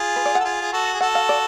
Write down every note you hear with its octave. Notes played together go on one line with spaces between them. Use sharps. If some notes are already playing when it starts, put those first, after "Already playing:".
Already playing: F4 G#4
B4
D5
A4 F#5
F4 G#4
G#4
F#4 A4
G#4
F#4 A4 F#5
F5
D5